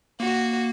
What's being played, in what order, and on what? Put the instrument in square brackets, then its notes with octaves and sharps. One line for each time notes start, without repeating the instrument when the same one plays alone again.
[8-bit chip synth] A#3 [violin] F#4